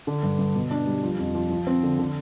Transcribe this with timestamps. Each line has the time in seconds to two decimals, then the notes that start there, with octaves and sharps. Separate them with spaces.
0.07 D3
0.23 G2
0.39 G2
0.55 B2
0.71 D4
0.87 G3
1.03 F3
1.19 F2
1.35 F3
1.50 F3
1.67 C4
1.83 D3
1.98 D3